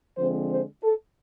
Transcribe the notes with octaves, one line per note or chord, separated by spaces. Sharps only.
D3 F3 G#3 C4 C5
C5
A4